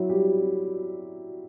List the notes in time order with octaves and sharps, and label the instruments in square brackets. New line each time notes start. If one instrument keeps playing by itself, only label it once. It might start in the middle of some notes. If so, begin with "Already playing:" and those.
Already playing: [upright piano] F#3 E4 F#4
G3 G4